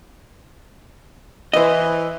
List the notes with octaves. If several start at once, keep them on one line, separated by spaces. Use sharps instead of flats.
E3 C5 D#5